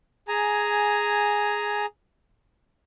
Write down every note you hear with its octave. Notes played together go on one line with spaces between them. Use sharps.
G#4 G#5 A#5